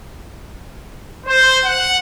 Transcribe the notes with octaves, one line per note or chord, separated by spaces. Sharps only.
C5
F#5